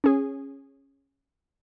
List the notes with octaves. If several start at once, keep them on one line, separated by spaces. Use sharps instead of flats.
C#4 G#4